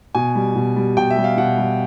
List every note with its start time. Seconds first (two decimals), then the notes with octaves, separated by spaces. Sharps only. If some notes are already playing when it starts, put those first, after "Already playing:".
0.15 B2 G#5
0.35 G3
0.56 B2
0.76 G3
0.97 B2 G5
1.10 E5
1.17 G3
1.24 F5
1.37 B2 F#5
1.58 G3